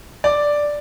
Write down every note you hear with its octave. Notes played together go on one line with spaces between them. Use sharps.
D5